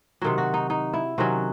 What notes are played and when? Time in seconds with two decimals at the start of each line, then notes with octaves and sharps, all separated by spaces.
0.21 C3 D#3 F#3 F#4
0.38 F#4
0.54 D#4
0.70 D#4
0.93 E4
1.18 C3 D#3 F#3 C#4 F#4